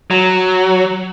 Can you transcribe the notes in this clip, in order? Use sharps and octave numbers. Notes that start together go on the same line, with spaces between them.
F#3